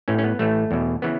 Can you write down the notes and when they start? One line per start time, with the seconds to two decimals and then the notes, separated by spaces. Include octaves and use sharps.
0.08 A1 A2 E3 C#4
0.18 C#4
0.24 B3
0.39 A1 A2 E3 A3
0.71 E2 B2
1.02 C#3 E3 B3